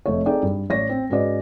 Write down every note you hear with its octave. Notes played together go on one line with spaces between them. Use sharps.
F1 A3 C#5
C4 D#4 G#4 A4 D5 G5
G2
A1 C#5 D5 A#6
C4
G#2 C#4 F#4 B4 D5 D#5